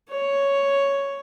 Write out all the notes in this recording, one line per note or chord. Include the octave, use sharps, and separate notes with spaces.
C#5